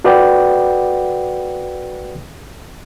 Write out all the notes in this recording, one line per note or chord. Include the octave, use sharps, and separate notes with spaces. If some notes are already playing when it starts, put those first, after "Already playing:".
F#4 A4 B4 D5 F#5 G5